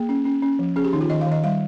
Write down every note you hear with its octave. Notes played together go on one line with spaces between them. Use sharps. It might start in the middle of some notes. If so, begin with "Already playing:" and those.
Already playing: A#3 G#4
C#4
C#4
C#4
F3
C#4 G#4
G4
D#3 D#4
F4
D#3 D#5
F5
D#3
D#5
G3 F5